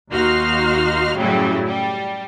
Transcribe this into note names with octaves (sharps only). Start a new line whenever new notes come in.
D#2 D#4 F#4 F5 C6 F6
F#2 A2 C#3 F#3 G3 E4
G3